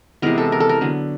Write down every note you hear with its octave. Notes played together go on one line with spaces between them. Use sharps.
C3 E3 G#3 B3 A#4
A4
A#4
A4
A#4
D3 F#3 B3